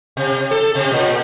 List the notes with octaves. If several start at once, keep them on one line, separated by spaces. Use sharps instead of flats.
C3
A4
C3
A#2